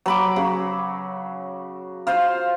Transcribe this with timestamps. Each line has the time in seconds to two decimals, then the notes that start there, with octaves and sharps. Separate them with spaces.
0.06 F#3 B5 D6
0.36 C#3
2.07 F4 C5 F5